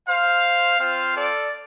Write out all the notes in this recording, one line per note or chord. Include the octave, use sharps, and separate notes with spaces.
C5 F5
C4 F4 C5 F5
A4 D5